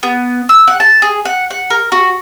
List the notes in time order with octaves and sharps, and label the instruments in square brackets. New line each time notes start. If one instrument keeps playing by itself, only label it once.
[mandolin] B3
E6
F#5
A5
G#4
F#5
F#5
A#4
F#4